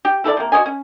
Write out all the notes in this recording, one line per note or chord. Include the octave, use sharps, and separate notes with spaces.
G4
E4 A4 A#4 D5
C3 A#3
F#4 C#5 D#5 G#5
C#4